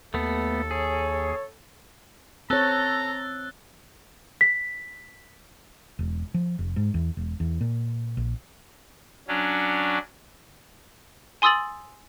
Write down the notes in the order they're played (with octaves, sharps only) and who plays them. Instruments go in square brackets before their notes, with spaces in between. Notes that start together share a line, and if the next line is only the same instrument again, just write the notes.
[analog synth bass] D#2 [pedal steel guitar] A3 B3 [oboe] A4
[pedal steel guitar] G#4 [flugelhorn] C#5
[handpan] C4 C#5 [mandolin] A4 [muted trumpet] A#5 [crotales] E6 F#6 A6
[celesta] B6
[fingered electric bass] E1
F3
F1
G#2
E2
E1
E2
A#2
A#1
[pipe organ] F#3 C#4 D4
[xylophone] G#5 C6 D#6 E6 A6 F#7